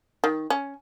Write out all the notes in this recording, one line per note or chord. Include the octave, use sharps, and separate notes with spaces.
D#3
C#4